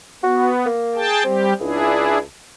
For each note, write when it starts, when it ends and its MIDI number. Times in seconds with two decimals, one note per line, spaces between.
0.24 0.67 59
0.24 0.50 66
0.66 1.06 58
0.95 1.23 68
0.95 1.23 79
0.95 1.23 81
1.24 1.53 55
1.24 1.53 60
1.24 1.53 67
1.60 2.24 37
1.60 2.18 62
1.60 2.18 64
1.60 2.18 68